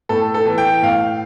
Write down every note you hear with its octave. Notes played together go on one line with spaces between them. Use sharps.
A2 A4
A4
E3
G5
A2 F5